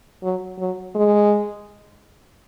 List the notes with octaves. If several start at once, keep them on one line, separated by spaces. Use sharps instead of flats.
F#3
F#3
G#3